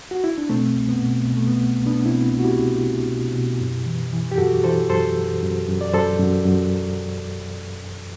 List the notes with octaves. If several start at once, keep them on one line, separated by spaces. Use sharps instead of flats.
F#4
E4
D4
B2 A3 C4
C2
B3
B2
B2
A3
B3
C2
C2
B3 D4
B2 C4 E4
C2
F#4
E4 G4
C2
C2
B2
B2
F#2
E3
E3
G4
F#2 F#4 A4
E3 A4 C5
F#2 A4 C5
F#2
F#2
F#2
D5
F#2 A4 C5
F#2
F#2